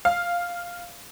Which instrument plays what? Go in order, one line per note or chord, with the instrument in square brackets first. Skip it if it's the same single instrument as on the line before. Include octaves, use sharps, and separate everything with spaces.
[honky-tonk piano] F5